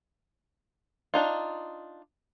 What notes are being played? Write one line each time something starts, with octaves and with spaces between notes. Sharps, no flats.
D4 D#4 F4